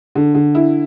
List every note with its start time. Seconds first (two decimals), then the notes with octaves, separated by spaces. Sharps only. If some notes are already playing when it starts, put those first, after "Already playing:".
0.15 D3
0.35 D3
0.55 E4